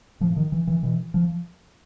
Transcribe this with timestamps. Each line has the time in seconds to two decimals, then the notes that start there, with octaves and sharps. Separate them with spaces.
0.20 A2 F3
0.36 D#3
0.52 E3
0.67 E3
0.83 B2 E3
1.14 F3